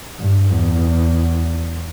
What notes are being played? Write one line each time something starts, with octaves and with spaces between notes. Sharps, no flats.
G2
E2